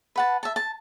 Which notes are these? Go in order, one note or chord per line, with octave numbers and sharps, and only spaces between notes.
B4 F#5 A5
E5 A5
A5